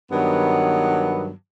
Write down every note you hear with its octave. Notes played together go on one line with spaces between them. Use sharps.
G2 D#3 F#3 B3